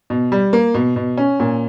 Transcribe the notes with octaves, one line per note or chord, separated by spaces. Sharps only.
B2
G3
A#3
B2
B2
C#4
A#2